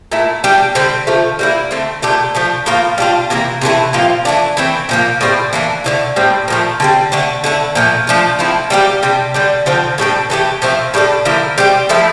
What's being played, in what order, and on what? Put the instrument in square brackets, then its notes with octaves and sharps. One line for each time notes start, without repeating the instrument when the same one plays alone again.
[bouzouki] A#2 A3 E4
G3 D4 G4
D3 G3 C4
D3 F3 A3
G3 A#3 E4
D3 A3 C4
A#2 A3 D4 G4
F3 A3 D4
A2 F3 A#3 F4
G3 D4 F4
C3 E3 A#3
C3 E3 A3 E4
A#2 F3 C4 F4
E3 A3 D4
E3 A3 C4
A#2 F3 A#3
A2 G3 C4 E4
E3 A#3 D4
D3 F3 A3 E4
A2 G3 C4
A#2 F3 A3
D3 G3 C4
D3 A3 D4
D3 A3 E4
A#2 F3 A3
F3 A3 D4 F4
F3 A3 C4 E4
G3 A#3 E4 G4
C3 G3 D4
D3 G3 D4
D3 F3 C4
A2 G3 D4 A4
E3 A3 D4 G4
F3 A3 C4 E4
A2 G3 D4 A4
D3 F3 A#3 E4
G3 C4 G4
F3 A3 E4 A4